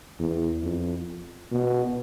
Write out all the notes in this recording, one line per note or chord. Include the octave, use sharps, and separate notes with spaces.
E2
F2
B2